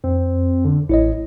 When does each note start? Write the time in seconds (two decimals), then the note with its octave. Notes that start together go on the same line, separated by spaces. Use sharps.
0.04 F2 C4
0.65 D3
0.89 A1 E4 C#5 D#5